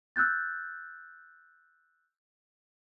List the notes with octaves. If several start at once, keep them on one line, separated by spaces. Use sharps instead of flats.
E6 F#6 G6 A6